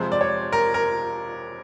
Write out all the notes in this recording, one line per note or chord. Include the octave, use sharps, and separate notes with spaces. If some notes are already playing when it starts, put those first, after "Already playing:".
Already playing: F2 C3 F3 G#3 C5
D5
C#5
A#4
A#4